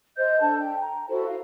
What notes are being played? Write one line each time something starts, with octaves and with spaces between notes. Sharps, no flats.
C5 D#5 G6
D4 A4 A5 G6
G5
A#5
E4 F#4 A4 C5
F5